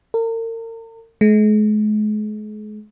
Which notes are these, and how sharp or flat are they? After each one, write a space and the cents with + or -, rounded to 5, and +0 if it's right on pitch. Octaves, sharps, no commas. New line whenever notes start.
A#4 -40
G#3 +40